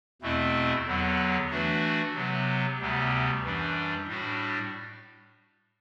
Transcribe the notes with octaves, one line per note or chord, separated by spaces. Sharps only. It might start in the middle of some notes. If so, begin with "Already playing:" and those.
E2 B2 A3 C4 E4
E2 D3 F#3 B3
E3 A3 D4 F#4
C3 F#3 B3
D2 C3 G3 B3
F#2 E3 G3 D4
A2 G3 D4 F#4